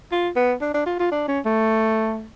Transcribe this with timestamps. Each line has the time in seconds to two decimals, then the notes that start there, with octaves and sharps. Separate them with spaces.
0.12 F4
0.36 B3
0.61 D4
0.74 D4
0.86 F4
1.00 F4
1.12 D4
1.28 C#4
1.45 A3